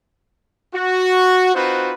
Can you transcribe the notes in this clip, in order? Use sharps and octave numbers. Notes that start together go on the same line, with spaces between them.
F#4
C4 D#4 F4 F#4 B4 C5